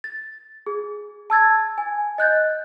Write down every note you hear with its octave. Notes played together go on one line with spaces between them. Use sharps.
A6
G#4
A5 E6 G#6 A6
G#5
D#5 F#6 G6 A6